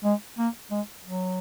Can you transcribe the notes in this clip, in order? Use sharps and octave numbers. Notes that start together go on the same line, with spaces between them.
G#3
A#3
G#3
F#3